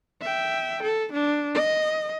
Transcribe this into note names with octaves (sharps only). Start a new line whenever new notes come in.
E5 G5
A4
D4
D#5